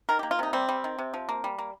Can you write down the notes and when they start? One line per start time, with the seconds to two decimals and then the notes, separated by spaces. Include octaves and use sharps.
0.09 D#3 A#4
0.19 G4
0.23 A#3
0.31 F4
0.39 C3 D#4
0.53 G3 C4
0.69 G3
0.84 D#3
0.99 C3
1.14 F3
1.29 A#3
1.44 G3
1.58 A#3